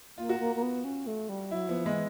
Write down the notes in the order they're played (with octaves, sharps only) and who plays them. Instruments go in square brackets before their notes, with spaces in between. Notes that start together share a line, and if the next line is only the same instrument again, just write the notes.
[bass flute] A#3 [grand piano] F4
[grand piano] F#4
[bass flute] A#3 [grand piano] F4
[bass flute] A#3
B3
C#4
A3
G3
[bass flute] F#3 [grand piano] E4
[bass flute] F3 [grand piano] B3
[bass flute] E3 [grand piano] G#3